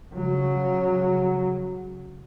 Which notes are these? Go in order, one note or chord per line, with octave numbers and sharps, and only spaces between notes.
C#3 F#3